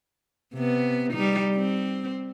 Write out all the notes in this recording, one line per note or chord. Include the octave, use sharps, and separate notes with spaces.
C3 B3
G3 D#4
C4